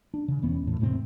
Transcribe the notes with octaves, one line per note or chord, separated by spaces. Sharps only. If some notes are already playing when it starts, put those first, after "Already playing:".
D4
C#3
E1 E2 B3 C#4
E2 A2
E1 A2 C3 C4